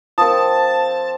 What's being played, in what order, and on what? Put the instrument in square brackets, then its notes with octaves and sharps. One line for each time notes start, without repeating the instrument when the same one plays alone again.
[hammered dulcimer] F3 C4 [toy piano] A#4 D#6 [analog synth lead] A5